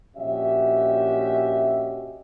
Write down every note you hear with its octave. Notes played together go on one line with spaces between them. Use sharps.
A#1 C#4 F#4 G4 D#5 E5